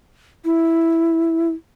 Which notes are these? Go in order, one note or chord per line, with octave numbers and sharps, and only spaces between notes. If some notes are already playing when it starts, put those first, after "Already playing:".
E4